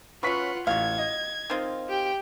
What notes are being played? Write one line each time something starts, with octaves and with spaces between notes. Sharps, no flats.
F#3 C#4 F4 B4 F#5 C#6 B6
A1 F#4 F5 G#6
D#5
D#3 C4 F4
G4 G5